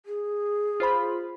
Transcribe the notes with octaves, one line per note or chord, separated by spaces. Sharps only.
G#4
F4 C5 B5